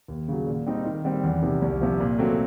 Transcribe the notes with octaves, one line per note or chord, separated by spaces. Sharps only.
D#2
C#3 F#3
A#2
G3 C4 D#4
D#3
G3 C4
E2
C3 D#3
C2
C3 F3
A#2
F#3 A3 C4